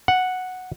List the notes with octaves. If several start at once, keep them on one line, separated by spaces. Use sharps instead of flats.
F#5